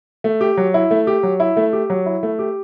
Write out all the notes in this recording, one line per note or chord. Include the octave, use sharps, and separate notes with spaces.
A3
G4
F#3
E4
A3
G4
F#3
E4
A3
G4
F#3
E4
A3
G4